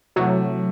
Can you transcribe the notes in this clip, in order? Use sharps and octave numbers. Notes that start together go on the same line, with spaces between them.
C3 E3 F#3 A3